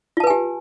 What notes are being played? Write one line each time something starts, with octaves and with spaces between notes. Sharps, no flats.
F4 G4 B4 G#5 A5